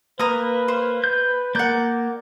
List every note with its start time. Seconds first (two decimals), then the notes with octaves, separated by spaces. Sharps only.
0.19 A#3 B4 A#5 D#6
0.68 C5
1.04 G6
1.55 A#3 A#4 D5 F#5 G6